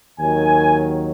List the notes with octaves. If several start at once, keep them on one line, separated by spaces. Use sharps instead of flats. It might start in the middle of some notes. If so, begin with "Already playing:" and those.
D#2 D#3 F#3 G#5